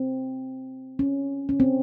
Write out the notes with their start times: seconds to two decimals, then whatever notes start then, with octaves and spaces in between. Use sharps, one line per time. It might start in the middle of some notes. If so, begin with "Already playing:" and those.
Already playing: C4
0.99 C#4
1.49 C#4
1.60 C4